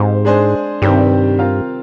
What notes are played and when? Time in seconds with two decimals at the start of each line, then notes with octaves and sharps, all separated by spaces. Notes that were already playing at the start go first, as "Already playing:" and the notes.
Already playing: G#2 C4 G4 C5 F5
0.25 G#3 D4 G#4 C5
0.82 G2 C3 D#3 G3 C4 G4
1.39 C4 F4 A#4 F5